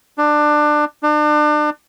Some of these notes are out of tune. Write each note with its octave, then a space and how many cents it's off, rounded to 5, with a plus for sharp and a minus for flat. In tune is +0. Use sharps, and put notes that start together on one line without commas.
D4 +20
D4 +35